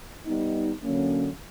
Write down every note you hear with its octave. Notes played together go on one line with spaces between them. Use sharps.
G3 B3 D#4
D3 F#3 A#3 C#4